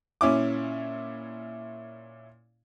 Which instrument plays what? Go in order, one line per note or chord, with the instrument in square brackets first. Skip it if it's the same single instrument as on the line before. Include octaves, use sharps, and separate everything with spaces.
[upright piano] A#2 C#4 E4 D6